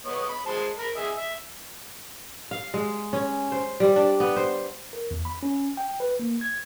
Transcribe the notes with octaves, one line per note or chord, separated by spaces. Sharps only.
B3 C#5 D#5
B5
G#3 C5 A5
A#4 A#5 B5
G#4 D#5 E5
E5
F5
G#3
C#4
C5
G3
D4
B3
C5
A#4
E2
B5
C#4
G5
B4
A#3
G#6